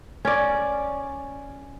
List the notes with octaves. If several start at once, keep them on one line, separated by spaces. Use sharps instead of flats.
C#4 D5